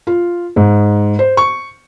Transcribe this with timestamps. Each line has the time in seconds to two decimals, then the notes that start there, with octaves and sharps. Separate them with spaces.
0.07 F4
0.56 G#2
1.19 C5
1.37 C#6